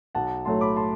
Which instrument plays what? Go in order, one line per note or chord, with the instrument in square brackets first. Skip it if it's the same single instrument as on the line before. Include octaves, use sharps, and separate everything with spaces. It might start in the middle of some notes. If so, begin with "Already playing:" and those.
[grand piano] B1 F#5 A5
A2 F#3 A3 A5 C6
B5 D6
A5 C6